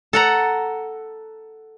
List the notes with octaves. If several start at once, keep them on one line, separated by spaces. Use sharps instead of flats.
A4 F#5 A#5